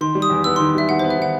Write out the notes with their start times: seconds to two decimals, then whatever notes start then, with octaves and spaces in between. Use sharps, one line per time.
0.01 D#3 C6
0.15 G3
0.22 D#6
0.30 E2
0.44 B3 E6
0.56 C6
0.60 D#3
0.75 G3 E5
0.89 E2 F#5
0.99 C5
1.04 B3
1.10 E5
1.18 D#3 F#5